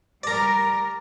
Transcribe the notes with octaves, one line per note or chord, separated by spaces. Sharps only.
G3 A#4 D5 A#5